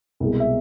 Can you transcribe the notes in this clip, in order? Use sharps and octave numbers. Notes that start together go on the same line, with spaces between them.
C2 B2 G#3
E5